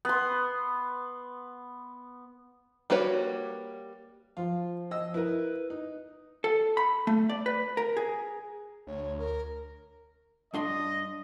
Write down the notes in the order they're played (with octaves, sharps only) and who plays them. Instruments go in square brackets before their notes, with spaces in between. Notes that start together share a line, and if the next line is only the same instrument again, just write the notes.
[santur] B3 C6
[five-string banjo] G3 A#3 F#4 B4 C#5
[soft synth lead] F3 [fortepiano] F4
[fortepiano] D#5 E6
[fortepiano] E4 A#4 [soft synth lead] B4
[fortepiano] D#4
[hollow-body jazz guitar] A4
B5
A3
D5
B4
A#4
G#4
[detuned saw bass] D2 [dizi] C#5
[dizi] A#4
[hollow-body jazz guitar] G2 D4 C6 [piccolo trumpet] D#5